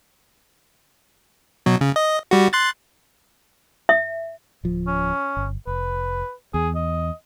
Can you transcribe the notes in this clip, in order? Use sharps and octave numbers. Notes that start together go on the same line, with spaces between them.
B2 F#3
C#3
D#5
G3 F#4
C6 F#6 A6
E5
D1 F3
C#4
G1
F1 B4
E2 G#4
D#5